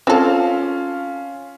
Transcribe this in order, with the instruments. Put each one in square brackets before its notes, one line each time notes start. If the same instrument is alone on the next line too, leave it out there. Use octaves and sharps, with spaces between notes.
[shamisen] C4 A4 [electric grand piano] C#4 F4 F5